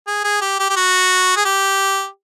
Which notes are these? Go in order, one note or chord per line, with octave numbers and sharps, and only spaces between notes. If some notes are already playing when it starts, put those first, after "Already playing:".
G#4
G#4
G4
G4
G4
F#4
G#4
G4